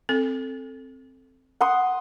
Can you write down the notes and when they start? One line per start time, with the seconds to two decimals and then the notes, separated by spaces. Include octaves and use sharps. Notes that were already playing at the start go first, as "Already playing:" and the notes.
0.09 C4 A4
1.61 F#5 C6 D#6